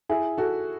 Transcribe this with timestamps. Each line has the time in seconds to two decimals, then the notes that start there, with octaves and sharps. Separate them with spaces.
0.09 E4 G#4
0.38 F#4 A4